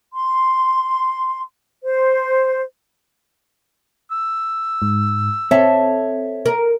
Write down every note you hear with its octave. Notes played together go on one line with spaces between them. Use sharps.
C6
C5
E6
G#2
C4 A4 C#5 E5
A#4